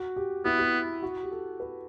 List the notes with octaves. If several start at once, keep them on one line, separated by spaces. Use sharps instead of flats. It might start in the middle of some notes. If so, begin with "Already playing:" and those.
Already playing: F#4
G4
B3 E4
E4
F#4
G4
A4
B4